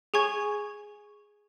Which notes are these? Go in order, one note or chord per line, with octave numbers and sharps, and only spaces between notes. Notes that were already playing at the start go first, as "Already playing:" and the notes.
G#4 G#5 C#6 G#6